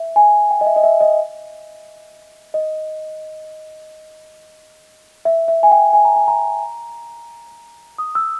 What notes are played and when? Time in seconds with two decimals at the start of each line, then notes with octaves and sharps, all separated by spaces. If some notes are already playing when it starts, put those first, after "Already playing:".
Already playing: E5
0.16 G#5
0.51 G5
0.61 D#5
0.66 E5
0.76 D#5
0.83 E5
1.01 D#5
2.54 D#5
5.25 E5
5.48 E5
5.63 G#5
5.72 G5
5.93 G#5
6.05 A#5
6.16 G#5
6.28 A#5
7.98 D#6
8.15 E6